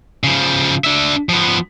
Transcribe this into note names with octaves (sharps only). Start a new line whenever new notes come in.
C#3 F3
D4 E5
F3 B3